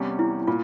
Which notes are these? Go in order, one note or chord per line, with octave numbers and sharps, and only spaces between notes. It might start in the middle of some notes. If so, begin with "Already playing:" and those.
Already playing: E2 C3 G3 C#4
E4
A#2 F4